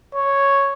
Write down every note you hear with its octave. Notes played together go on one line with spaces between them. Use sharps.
C#5